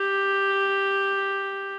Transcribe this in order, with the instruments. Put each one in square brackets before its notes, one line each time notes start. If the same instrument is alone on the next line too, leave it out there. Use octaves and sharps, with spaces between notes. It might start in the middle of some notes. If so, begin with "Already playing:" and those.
Already playing: [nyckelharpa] G4